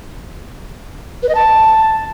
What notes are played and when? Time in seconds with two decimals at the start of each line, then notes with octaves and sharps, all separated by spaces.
1.23 B4
1.29 D#5
1.35 A5